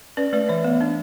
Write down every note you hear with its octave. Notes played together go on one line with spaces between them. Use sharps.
C#4 B4 D5
A3 B4 D5
E3 C#5 E5
B3
D4